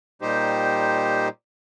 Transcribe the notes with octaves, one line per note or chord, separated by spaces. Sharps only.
A#2 G3 D#4 G4 C5